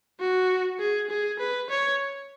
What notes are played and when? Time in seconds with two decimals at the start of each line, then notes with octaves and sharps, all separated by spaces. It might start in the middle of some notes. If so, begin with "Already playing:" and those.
0.20 F#4
0.79 G#4
1.10 G#4
1.39 B4
1.70 C#5